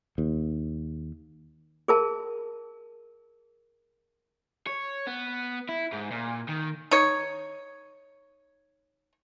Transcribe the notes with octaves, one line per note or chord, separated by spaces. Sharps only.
D#2
G#4 A#4 A5
C#5
B3
E4
G#2
A#2
D#3
D#4 C#5